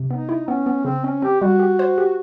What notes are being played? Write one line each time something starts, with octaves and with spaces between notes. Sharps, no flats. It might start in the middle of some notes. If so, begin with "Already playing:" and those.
Already playing: C3
B3 D#4
E4
B3 C#4
B3
C#3 C4
C4 C#4
C4 G4
G3 F#4
G4
C5
G4